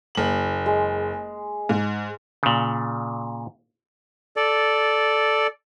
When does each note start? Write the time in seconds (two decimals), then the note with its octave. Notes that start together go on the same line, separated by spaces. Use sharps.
0.15 F#1 F#7
0.66 G#3
1.69 G#2
2.43 A#2 C#3
4.36 A4 D5